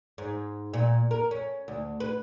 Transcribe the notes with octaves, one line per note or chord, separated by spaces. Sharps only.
G#2
A#2
A#4
C#4
D2
B4